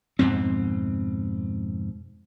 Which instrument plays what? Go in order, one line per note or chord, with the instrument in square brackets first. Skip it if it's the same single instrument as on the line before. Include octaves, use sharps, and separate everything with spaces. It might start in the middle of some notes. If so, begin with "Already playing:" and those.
[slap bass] F2 G#2 B2 C4